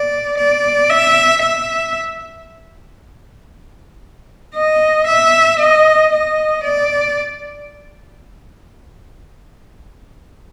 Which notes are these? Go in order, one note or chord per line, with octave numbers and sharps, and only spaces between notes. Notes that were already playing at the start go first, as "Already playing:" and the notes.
Already playing: D5
D5
E5
E5
D#5
E5
D#5
D#5
D5